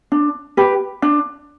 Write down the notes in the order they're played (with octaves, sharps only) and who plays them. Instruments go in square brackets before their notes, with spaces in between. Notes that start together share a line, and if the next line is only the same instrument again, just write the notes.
[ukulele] D4
G4 B4
D4